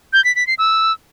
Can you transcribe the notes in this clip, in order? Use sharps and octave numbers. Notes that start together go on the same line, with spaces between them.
G6
B6
B6
C7
E6